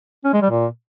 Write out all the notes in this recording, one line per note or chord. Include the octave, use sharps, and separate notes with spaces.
C#4
G#3
G3
A#2